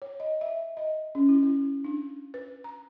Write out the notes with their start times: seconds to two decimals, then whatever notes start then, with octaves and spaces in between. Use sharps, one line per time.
0.02 C#5
0.20 D#5
0.41 E5
0.77 D#5
1.15 C#4
1.29 E4
1.43 E4
1.84 D4
2.34 B4
2.64 A#5